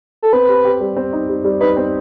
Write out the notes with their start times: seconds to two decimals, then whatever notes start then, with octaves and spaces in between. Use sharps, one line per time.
0.23 A4
0.33 C4 B4
0.48 G4
0.65 G4
0.80 G3
0.96 C4
1.13 D#4
1.29 G3
1.44 G3
1.60 D#4 B4
1.77 C4